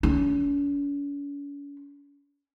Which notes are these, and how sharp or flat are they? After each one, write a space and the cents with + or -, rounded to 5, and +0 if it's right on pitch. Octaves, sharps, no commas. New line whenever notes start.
C#4 +40